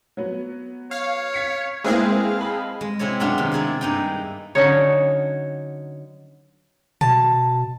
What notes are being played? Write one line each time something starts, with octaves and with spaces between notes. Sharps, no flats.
F#3 B3
C#5 F5
G#6 B6 C#7
G#3 A#3 C4 E4 G#4 B4 F5
A5 B5
G#3
C3 C4 E4 G#4 C#5
F#2 B2 F#3 D4 F4
C3 D#3
D#4 E4 G#4 D5
G2 A#3 D#4 E4 G5
D3 F#3 C#4 D#4 C#5
B2 A5